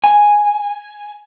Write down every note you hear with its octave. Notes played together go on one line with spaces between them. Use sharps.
G#5